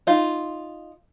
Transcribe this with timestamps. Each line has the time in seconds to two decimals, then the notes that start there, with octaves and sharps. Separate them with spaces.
0.07 D#4 F4